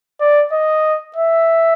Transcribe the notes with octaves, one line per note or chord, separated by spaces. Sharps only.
D5
D#5
E5